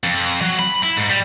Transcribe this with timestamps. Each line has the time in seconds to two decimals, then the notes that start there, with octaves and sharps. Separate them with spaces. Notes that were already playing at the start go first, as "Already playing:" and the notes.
0.04 F2
0.42 F#3
0.59 B5
0.83 E4
0.97 G#2
1.10 G3